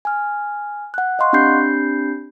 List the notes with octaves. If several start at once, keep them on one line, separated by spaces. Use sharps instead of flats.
G#5 F6
F#5 F#6
D#5 F5 F#5 C6 C#6 F#6
C4 D4 G4 B5 G6 C7